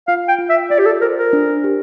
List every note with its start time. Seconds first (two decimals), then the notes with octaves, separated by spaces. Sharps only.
0.08 F4 F5
0.28 G5
0.38 F4
0.50 E5
0.70 F4 D5
0.79 G4
0.86 A4
1.02 A#4 C5
1.18 A#4
1.33 D4
1.64 G4